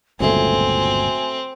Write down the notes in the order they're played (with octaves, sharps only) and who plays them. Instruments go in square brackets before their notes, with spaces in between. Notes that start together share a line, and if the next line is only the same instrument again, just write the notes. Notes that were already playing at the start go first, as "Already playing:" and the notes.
[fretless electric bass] G1 C#2 A#2 [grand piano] F#3 A3 [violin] C4 [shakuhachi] G#5